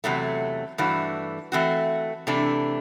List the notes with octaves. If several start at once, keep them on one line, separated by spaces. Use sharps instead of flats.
E2 C3 F#3 A3
G2 E3 A3 D4 F#4
E3 A3 C4 F#4
C3 E3 A3 D4